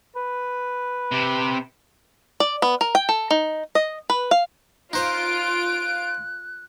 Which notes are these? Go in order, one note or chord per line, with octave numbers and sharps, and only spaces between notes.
B4
C3 G4
D5
B3
A#4
G5
A4
D#4
D#5
B4
F5
D#4 F4 C5 F#6 D7